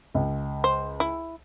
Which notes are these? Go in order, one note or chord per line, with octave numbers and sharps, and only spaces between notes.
C#2
C5
E4